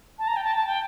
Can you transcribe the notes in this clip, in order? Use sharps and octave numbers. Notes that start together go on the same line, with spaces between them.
A5
A#5
G5
A5
A5
G5